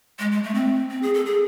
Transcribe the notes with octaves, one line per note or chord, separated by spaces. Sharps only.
G#3
G#3
A3
C4
C4
G#4
A4
G#4